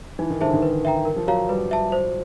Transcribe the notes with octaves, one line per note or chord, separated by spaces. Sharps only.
E3 D#4
D#3
D3 G#4 C5 E5 A5
D#3
B4
E5 G5 A#5
A#4
F3
F#3 C#5 F5 A#5
G3 B4
E5 A5
C5